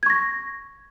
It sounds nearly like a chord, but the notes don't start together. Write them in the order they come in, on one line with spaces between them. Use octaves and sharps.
G#6 C#6 A#6